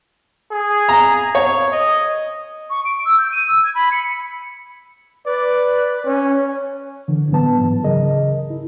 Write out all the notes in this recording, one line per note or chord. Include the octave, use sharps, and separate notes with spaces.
G#4
A#5
C#5
D#5
C#6
D7
E6
G6
D#7
E6
G#6
B5
C#7
B4 D5
C#4 C#5
D3 E3 D4
A2 F#3 B3 B4 A5
G#2 E3 F#3
C#3 G#4 A#4 D#5
E4